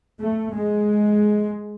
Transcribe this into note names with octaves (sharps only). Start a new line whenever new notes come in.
A3
G#3